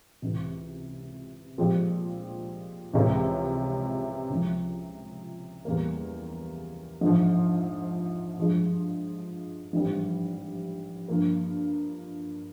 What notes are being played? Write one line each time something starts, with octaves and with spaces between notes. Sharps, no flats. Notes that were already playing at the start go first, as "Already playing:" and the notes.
C#2 C3 E3
A#2 F3 G#3 C4 G4
C#2 C3 E3 G#3 C#4
C#2 C#3 F3 G#3 E4
E2 C#3 E3 G3 A#3
A#1 G#2 F3
G2 F3 G#3
A#1 G#2 E3 G3 C4
G2 F3 A#3